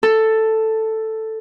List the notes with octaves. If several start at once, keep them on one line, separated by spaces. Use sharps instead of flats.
A4